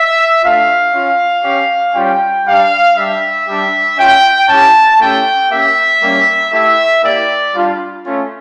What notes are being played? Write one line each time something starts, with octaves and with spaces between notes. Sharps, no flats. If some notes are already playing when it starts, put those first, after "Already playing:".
Already playing: E5
A3 D4 F4 F5
C#4 F4
C#4 G4
G3 C#4 F4 G5
G3 D4 G4 F5
G3 D4 G4 E5
G3 D4 G4
C#4 F4 G5
C#4 E4 G4 A5
A3 C#4 E4 G4 G5
A#3 C#4 G4 E5
G3 A#3 C#4 G4
A3 E4 G4 E5
A#3 E4 G4 D5
G3 D4 F4
A3 C#4 F4